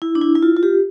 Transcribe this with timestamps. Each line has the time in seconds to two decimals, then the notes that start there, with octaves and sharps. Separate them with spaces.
0.02 E4
0.15 D4
0.22 E4
0.35 E4
0.43 F4
0.57 F4
0.63 G4